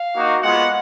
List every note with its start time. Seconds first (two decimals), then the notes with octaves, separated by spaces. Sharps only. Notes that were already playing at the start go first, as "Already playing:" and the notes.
Already playing: F5
0.14 A#3 D#4 F#4
0.43 G#3 B3 F4 F#5